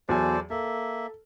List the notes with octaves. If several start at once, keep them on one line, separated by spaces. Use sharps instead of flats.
E2 F#3 A4 C5 D5 G#5
A#3 A4 E5